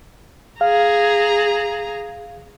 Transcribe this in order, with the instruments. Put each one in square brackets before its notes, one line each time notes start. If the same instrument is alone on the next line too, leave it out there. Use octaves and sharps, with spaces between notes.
[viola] G#4 A#5 [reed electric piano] F5